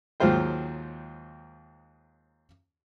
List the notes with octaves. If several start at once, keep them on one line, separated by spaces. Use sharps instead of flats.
D#2 G#2 F#3 F4 C5 G5